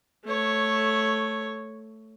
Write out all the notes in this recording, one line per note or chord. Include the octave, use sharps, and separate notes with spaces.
A3 C#5